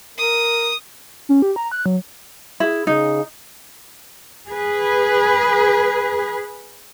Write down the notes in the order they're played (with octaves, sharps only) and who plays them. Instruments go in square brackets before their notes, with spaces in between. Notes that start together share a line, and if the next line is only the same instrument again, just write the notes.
[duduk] A#4 [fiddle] D#6
[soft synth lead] C#4
G4
A#5
F#6
F#3
[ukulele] E4 [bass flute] G#4
[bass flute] C#3 [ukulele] D#4
[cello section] G#4 B4